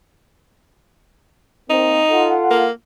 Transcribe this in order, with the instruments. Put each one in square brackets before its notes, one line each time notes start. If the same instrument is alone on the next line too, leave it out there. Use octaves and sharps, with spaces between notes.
[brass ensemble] A#3 C4 [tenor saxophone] D#4
[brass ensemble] F4 A4 F#5
[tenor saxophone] A#3